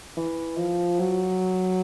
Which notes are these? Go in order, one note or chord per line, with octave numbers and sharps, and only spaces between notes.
E3
F3
F#3